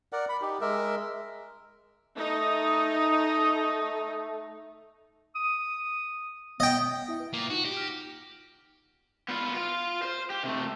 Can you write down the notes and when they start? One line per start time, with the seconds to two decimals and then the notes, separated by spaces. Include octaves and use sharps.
0.13 A#4 D5 F#5
0.29 B5
0.42 D#4 G4
0.61 G#3 A#4 E5
2.18 A3 D#4
5.35 D#6
6.60 B3 D#5 G5
7.08 E4 E5 G5
7.20 B4
7.33 A#2 A#3
7.50 D#4 F4 F#4
7.65 G4
7.77 F6 A#6
9.29 B3 F4
9.55 F4
10.03 C5
10.30 G4
10.44 C3 A3